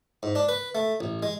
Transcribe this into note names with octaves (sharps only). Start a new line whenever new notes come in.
G#2
D4
B4
A3
A1
G#3